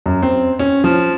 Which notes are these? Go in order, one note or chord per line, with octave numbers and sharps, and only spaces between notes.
F#2
C4
C#4
F3